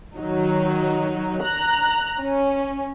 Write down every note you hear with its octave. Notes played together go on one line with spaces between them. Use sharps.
D#3 F#3 D#4
A#5 F#6
C#4